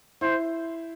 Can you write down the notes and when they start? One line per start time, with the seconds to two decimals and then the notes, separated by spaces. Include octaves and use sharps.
0.21 E4 C5